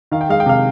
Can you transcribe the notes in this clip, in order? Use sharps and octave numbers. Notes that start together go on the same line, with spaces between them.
D#3 F5
G5
G#3 F5
G5
C3 F5